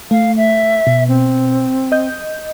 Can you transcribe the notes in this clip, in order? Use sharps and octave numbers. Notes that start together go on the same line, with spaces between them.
A3 F5
E5
B2
C4
D#5 G6